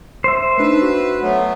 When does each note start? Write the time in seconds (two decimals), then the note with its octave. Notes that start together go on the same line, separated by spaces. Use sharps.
0.24 C5 E5
0.58 A3 D4 D#4 B4
0.82 F#4
1.21 F#3 A3 B3